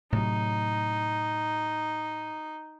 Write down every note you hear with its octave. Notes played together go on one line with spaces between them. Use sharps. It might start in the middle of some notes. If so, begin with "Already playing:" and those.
A2 C3 F#3 D#4